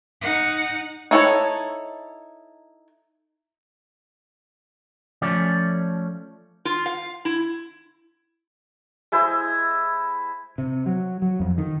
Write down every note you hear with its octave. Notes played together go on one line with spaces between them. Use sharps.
D#4 F#5
D#4 E4 A4 C5 C#5
F3 A3 C#4 D5
F4
F5
E4
G#3 E4 C5
C3
F#3
F#3
F2
D#3